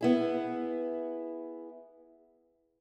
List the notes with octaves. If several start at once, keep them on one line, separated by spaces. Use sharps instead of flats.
B3 E4 G#4